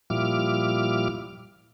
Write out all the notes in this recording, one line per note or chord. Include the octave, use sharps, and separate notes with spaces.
A#2 F3 G3 E4 D6 F6